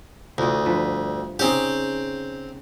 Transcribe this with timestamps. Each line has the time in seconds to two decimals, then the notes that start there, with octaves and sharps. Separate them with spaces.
0.38 D2 E3 F4 D#5
0.65 G2 F3 B4
1.39 C#3 C4 D#4 G4 G#4